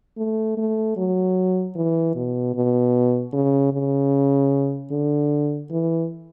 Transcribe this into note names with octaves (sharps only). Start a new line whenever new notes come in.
A3
A3
F#3
E3
B2
B2
C#3
C#3
D3
E3